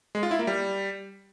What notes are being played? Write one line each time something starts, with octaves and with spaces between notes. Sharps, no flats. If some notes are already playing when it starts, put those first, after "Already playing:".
G#3
F4
E4
A#3
G3